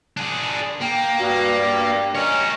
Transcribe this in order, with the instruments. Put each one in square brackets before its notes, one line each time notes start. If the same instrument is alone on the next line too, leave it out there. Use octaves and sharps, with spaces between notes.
[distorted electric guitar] D4 G#4
[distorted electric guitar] A#3 [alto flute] G5
[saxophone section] G2 [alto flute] F#4
[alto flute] G5
[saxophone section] C#4 [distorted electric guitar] A#4 C#5 [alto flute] D#5